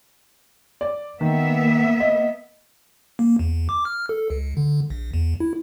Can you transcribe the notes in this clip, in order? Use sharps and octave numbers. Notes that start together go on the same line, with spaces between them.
D5
D#3 A#3 B3 E5
D#5
A#3
E2
D6
F6
A4
C#2
D3
A#1
E2
E4